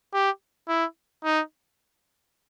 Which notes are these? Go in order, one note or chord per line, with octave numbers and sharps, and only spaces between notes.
G4
E4
D#4